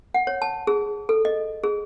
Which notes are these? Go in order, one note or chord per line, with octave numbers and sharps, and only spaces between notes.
F#5
C#5
A5
G#4
A4
D#5
G#4